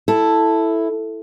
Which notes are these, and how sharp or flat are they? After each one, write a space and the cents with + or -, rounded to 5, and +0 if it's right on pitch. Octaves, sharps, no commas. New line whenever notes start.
E4 +0 A4 +0